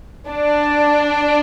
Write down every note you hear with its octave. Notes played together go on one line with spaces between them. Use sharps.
D4